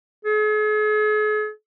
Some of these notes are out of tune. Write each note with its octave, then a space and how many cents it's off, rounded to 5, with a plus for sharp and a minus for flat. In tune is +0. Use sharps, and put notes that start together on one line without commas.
G#4 +45